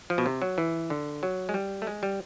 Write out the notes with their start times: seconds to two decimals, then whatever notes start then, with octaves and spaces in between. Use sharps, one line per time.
0.10 F3
0.18 B2
0.26 C3
0.42 F#3
0.58 E3
0.90 D3
1.23 F#3
1.49 G#3
1.54 G3
1.82 A3
1.87 G#3
2.03 G3